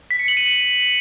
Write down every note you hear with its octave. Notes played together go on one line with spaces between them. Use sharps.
B6
C#7
F#7
D#7